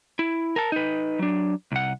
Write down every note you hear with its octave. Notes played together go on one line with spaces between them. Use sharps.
E4
A#4 A5
D#4 B4
F#3 D4
C2 F#5